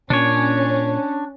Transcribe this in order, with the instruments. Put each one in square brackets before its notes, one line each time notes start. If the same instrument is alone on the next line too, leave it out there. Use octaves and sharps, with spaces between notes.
[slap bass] A#2 [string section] C#4 [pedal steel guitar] D4 C#5